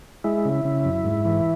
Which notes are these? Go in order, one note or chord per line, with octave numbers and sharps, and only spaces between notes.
G#3 E4
C#3
C#3
F#2
G#2
E3